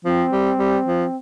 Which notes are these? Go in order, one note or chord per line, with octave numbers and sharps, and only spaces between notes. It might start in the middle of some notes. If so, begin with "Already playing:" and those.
F3 C4
G3
G3
F3